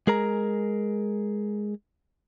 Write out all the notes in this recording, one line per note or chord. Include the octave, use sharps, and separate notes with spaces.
G#3 G#4 A#4 A#5